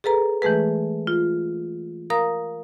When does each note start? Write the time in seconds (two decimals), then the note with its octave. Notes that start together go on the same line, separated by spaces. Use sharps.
0.04 G#4 A4 B4 A#5
0.42 E3 G#3 A3 G#4 B4
1.07 F4
2.10 A#4 F5 A#5 D#6